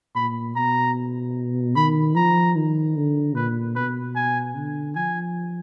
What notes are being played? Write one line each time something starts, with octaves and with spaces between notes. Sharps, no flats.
A#2 B5
B2 A#5
D#3 B5
F3 A#5
D#3
D3
A#2 B4
B2 B4
G#5
D3
F3 G#5